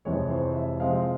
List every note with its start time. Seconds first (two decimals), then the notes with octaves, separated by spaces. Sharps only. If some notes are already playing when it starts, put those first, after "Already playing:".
0.05 F2 C3 E3 G#3 C#5
0.30 C5
0.55 E5
0.80 C3 F3 G#3 C4 F5